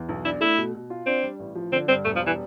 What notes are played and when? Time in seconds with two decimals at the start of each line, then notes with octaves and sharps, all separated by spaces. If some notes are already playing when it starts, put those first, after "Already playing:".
Already playing: E2
0.09 B1
0.25 D4 E4
0.41 A3 E4
0.58 B2
0.74 B2
0.90 F4
1.06 C4 D4
1.23 G3
1.39 A1
1.55 F3
1.72 D3 C4
1.88 G2 C4
2.05 E1 A3
2.16 F3
2.21 G3
2.27 E3